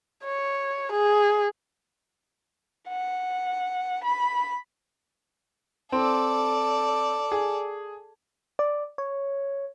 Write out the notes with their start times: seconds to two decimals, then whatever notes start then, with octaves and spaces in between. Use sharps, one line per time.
0.24 C#5
0.92 G#4
2.89 F#5
4.03 B5
5.92 C4 A4 D5
7.32 G#4
8.59 D5
8.98 C#5